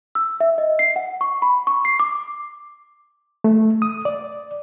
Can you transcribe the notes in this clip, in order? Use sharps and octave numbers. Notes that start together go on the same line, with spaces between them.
E6
E5
D#5
C7
F#5
C#6
B5
C#6
C7
D6
A3
D#6
D5